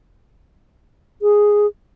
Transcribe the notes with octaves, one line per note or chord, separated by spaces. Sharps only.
G#4